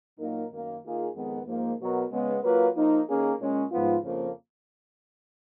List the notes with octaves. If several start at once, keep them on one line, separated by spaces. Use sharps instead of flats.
A#2 F#3 A#3 D#4 A#4
F#2 D#3 A#3
D#3 A#3 F4 G#4
F2 D#3 G#3 B3
G#2 F3 A#3
B2 F#3 B3 F#4 A#4
C#3 G#3 B3
F#3 A#3 F4 B4
F3 A#3 D#4
D#3 A#3 C#4 G#4
A#2 G#3 C#4
G#2 F3 B3 F4
F2 C#3 F3 A#3